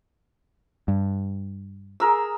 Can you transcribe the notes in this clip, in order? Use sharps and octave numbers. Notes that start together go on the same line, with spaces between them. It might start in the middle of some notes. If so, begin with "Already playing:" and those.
G2
G#4 A#4 E6